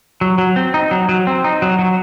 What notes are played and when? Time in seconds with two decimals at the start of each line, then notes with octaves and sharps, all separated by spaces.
0.21 F#3
0.38 F#3
0.56 C4
0.74 D#4
0.91 F#3
1.09 F#3
1.27 C4
1.44 D#4
1.62 F#3
1.79 F#3